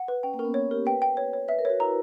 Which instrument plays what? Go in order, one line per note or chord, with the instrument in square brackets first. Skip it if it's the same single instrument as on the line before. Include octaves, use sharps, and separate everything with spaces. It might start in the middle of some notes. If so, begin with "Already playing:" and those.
Already playing: [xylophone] F#5
B4
[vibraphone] C#4 [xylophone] G5
[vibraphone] A#3
[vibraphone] C#4 [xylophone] A#4
[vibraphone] B3
[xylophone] C#5
[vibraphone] G4 [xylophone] A#4
[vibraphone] B4 [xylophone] G5
[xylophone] G5
C#5
C#5
[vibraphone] B4 [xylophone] E5
[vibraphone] A#4
[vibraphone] F#4 [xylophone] C#5
[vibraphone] E4 [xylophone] A#5